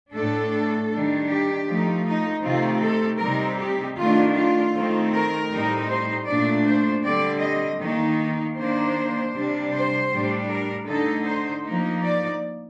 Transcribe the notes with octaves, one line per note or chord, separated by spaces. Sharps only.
A2 A3 D4 A4
D#3 G3 D4
G4
F3 A3 D#4
D#4
C3 D#3 A3 C4 D#4 F4
A4
C3 G3 C4 D#4 A#4
G4
D#3 A3 D4 F4
F4
D#3 A3 C4 D#4
A#4
A2 G3 C4 D#4
C5
A#2 A3 D4 D5
C5
D3 G3 C4 D5
D#5
D#3 A#3 D#4
D#3 A#3 D4 C5
C3 G3 D4
C5
A2 G3 D4
A#4
D3 A3 D#4 A4
C5
F3 A#3 D#4
D5